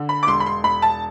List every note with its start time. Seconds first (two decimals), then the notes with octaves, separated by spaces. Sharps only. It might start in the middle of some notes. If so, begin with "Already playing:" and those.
Already playing: D3
0.09 B5
0.23 D6
0.27 E1 C6
0.40 B5
0.46 C6
0.64 E1 B5
0.82 A5